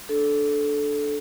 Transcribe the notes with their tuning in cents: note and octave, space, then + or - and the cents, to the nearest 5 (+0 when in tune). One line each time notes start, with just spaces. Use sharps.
D4 +0 A4 -15